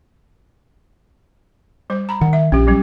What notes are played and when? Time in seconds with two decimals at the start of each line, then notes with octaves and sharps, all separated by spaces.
1.90 G3 C5
2.09 A#5 B5
2.21 D#3 F#5
2.33 E5
2.52 A#1 C#4 G4
2.67 F#3 G3 C#4